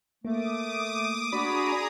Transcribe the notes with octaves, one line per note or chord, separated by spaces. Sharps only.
A3 A#3 D6 D#6
D4 F#4 G#4 D5 A#5 B5 D#6